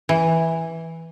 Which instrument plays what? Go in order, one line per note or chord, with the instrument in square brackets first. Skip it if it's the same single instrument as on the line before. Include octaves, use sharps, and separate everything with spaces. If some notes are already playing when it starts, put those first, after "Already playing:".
[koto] E3